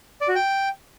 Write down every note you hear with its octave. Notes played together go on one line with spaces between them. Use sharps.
D5
F#4
G5